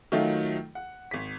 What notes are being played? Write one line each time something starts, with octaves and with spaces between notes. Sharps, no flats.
D#3 F#3 A3 D#4 F4
F#5
G#1 B6